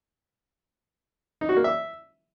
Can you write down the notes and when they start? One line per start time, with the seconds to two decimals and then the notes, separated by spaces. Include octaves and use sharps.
1.41 D#4
1.49 F#4
1.57 A#3
1.64 E5